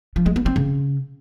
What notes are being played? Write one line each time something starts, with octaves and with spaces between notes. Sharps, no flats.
F3
G#3
B3
C4
C#3